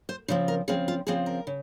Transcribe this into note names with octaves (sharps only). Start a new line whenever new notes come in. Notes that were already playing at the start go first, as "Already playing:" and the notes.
C5
C#3 F3 C4 C5
A#4
C#3 F3 C4 G#4
F4
C#3 F3 C4 G#4
A#4
C#3